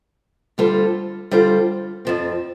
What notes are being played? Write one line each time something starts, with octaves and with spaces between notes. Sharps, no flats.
D3 G3 F4 A4 C5
D3 G3 F4 A4 C5
F2 F3 C4